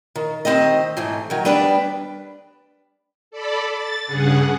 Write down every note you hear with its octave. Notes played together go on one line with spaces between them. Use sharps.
D#3
D#3 C4 G4 D#5
G#2 E3 A3
D#3 F#3
G3 B3 D4 B4 D5
A4 D5 B5
A6
G2 C#3 G#4 F#5